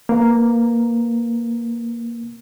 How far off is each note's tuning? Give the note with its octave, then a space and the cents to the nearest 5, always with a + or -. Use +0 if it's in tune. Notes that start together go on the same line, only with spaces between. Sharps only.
A#3 +0 B4 +0 A#5 -5